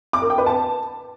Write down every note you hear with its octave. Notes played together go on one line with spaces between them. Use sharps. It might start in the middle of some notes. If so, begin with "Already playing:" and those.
D6
A#4
G5
B4
A5